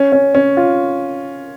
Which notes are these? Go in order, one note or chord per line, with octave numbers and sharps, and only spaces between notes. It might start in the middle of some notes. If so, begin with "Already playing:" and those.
Already playing: C#4
C#4
C#4
F4